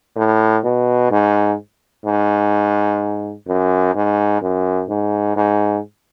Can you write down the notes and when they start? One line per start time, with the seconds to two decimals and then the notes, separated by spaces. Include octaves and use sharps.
0.16 A2
0.64 B2
1.11 G#2
2.05 G#2
3.47 F#2
3.94 G#2
4.41 F#2
4.89 G#2
5.36 G#2